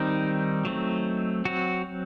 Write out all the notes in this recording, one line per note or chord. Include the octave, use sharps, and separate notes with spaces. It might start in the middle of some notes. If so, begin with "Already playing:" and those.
Already playing: D#3 G3 C4 D#4
F#3 A3 C4
F#3 C4 F#4